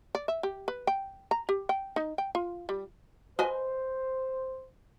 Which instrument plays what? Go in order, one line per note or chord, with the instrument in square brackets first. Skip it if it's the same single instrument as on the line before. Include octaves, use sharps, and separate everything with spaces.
[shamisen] D5
E5
G4
B4
G5
A#5
G4
G5
D#4
G5
F4
G3
[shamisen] B4 D#5 G#5 [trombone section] C5